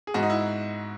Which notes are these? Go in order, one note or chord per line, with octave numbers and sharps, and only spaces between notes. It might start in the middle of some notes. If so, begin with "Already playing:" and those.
G#4
G#2 F#4
D#4
E4